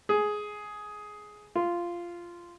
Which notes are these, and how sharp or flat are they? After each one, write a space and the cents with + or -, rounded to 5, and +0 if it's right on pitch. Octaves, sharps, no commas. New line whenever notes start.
G#4 +10
F4 -10